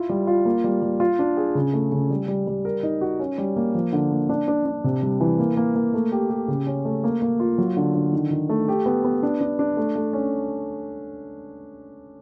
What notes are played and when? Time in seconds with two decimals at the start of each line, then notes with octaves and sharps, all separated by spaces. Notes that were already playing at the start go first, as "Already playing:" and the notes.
Already playing: E4 F4
0.09 G3
0.27 F4
0.45 A#3
0.64 G3
0.82 G3
1.00 F4
1.19 D4
1.37 G#4
1.55 C#3
1.73 A3
1.92 C#3
2.10 G3
2.28 G3
2.47 G3
2.65 A#4
2.83 D#4
3.01 F#4
3.19 C#4
3.38 G3
3.56 A#3
3.75 F3
3.93 D3
4.11 A#3
4.29 D4
4.48 D4
4.66 D4
4.84 C3
5.03 G3
5.21 E3
5.39 A#3
5.57 A#3
5.76 A#3
5.94 A3
6.12 G4
6.30 G4
6.48 C#3
6.67 C#4
6.85 A3
7.04 A#3
7.22 A#3
7.40 F4
7.58 F#3
7.77 D3
7.95 D3
8.13 D#3
8.31 D#3
8.49 A3
8.68 G4
8.86 B3
9.04 B3
9.23 D4
9.41 D4
9.59 D4
9.77 A3
9.95 A3
10.13 C#4